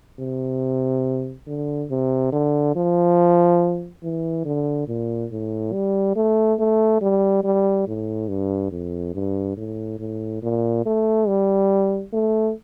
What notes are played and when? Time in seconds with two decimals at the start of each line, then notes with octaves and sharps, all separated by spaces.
0.20 C3
1.47 D3
1.90 C3
2.32 D3
2.76 F3
4.03 E3
4.45 D3
4.88 A#2
5.31 A2
5.73 G3
6.16 A3
6.59 A3
7.01 G3
7.44 G3
7.87 A2
8.29 G2
8.71 F2
9.14 G2
9.57 A2
9.99 A2
10.43 A#2
10.86 A3
11.28 G3
12.13 A3